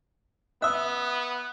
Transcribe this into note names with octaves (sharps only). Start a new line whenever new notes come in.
B3 E5 D#6 E6 F#6